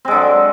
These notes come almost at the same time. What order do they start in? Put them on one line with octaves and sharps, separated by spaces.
C4 G#3 D3 F#3